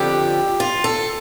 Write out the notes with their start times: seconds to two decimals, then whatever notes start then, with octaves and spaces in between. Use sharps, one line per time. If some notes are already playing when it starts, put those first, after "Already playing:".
Already playing: F2 D3 F3 G4
0.60 F4
0.84 A4